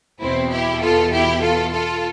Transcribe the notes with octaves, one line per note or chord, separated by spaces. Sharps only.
E2 B2 C4 E4
E4 G4
F4 A4
E4 G4
F4 A4
F4 A4